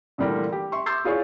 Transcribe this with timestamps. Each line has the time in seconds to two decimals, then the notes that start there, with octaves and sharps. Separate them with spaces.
0.18 A#2 D3 E3 G3 A3 A#4
0.52 G4
0.72 E5 C6 C#6
0.86 C6 D6 E6 G6 A6 C7
1.04 E4 F4 G#4 C#5 D5 C#6